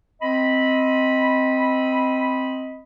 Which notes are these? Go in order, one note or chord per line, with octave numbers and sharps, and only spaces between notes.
C4 D#5 B5